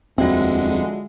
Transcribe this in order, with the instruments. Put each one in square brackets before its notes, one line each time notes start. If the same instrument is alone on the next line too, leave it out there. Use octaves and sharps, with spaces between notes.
[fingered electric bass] D#1 F2 [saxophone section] D3 G#3 [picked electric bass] C4 [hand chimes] F4 F#4 E5